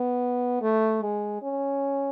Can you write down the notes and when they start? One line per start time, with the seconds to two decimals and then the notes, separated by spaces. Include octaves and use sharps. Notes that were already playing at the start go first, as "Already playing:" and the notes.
Already playing: B3
0.62 A3
1.02 G#3
1.42 C#4